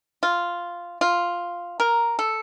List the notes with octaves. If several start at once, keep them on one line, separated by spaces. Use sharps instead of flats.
F4
F4
A#4
A4